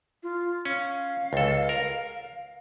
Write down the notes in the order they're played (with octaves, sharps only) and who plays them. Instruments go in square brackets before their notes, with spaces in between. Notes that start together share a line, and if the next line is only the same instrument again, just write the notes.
[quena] F4
[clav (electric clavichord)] C#4 [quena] F5
[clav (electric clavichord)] C#2 A4
A#4